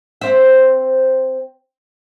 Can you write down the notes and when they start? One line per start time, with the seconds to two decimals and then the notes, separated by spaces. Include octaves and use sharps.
0.21 C4 E5